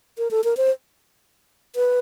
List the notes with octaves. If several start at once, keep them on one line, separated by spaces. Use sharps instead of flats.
A#4
A4
A#4
C5
B4